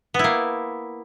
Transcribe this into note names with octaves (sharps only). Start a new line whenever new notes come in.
A#3 B3 E4